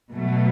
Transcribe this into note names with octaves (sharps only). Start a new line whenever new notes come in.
B2 F#3 A3